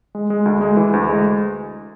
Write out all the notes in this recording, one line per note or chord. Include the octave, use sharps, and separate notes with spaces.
G#3
G#3
D2
G#3
E3
D2
G#3